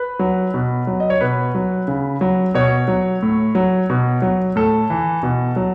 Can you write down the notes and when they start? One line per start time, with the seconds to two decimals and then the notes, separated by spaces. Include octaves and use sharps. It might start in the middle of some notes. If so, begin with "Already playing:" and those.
Already playing: B4
0.19 F#3
0.54 B2
0.87 F#3
1.00 D#5
1.10 C#5
1.21 B2 B4
1.55 F#3
1.88 C#3
2.21 F#3
2.54 B2 C#5
2.88 F#3
3.22 A2
3.55 F#3
3.90 B2
4.22 F#3
4.56 A2 A4
4.90 E3
5.23 B2
5.56 F#3